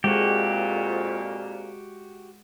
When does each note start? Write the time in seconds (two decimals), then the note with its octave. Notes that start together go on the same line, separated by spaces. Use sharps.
0.04 F2 A#2 G#3 F#4 G4